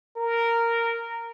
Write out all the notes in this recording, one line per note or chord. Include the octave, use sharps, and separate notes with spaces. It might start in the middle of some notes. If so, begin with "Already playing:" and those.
A#4